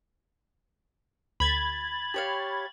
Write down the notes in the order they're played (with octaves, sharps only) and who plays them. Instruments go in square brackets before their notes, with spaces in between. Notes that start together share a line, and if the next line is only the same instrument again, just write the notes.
[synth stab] D2 [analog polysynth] B5 G#6 A6 [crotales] F#7
[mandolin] G4 C#5 F5